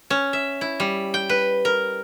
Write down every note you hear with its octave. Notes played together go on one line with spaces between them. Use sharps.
C#4
E5
E4
G3
G5
B4
A#4